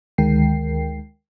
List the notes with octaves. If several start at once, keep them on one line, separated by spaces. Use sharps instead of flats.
D2 D#3 G#3 A#4 G5 C7